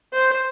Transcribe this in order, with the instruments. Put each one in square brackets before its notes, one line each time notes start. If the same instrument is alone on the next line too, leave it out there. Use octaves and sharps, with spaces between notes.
[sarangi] C5